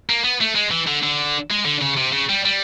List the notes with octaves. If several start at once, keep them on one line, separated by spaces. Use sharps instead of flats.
A#3
B3
A3
G#3
E3
D3
D3
G#3
D3
C#3
C3
C#3
G3
G3